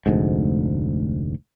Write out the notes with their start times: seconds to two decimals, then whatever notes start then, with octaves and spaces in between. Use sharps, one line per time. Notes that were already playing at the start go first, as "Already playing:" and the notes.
0.06 F1 D2 G#2